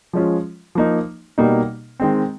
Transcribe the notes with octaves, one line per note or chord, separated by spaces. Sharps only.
F3 G#3 C#4 F4
F3 A#3 D#4
B2 G3 A#3 D#4
D#3 G#3 C4